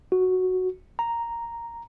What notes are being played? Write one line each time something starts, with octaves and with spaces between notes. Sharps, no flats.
F#4
A#5